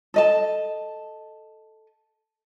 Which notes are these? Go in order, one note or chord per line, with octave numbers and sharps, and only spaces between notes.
A4 D#5 A5